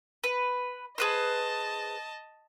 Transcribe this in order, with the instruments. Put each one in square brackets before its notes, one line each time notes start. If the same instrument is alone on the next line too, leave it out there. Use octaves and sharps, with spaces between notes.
[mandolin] B4
[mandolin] G#4 B4 C5 [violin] D#5 A5